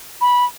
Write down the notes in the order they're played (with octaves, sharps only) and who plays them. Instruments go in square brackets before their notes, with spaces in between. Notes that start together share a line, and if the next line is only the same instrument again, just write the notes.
[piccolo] B5